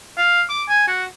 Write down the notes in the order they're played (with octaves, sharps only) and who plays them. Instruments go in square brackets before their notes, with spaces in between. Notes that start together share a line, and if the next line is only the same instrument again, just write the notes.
[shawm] F5
D6
G#5
F#4